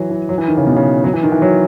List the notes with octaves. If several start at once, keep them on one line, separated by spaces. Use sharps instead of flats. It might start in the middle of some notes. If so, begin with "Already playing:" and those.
Already playing: E3 F#3
E3
F#3
E3
D#3
C#3
B2
C#3
F#3
E3
D#3
E3
F#3